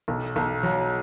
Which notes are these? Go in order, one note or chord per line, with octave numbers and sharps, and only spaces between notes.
B1
B1
F#3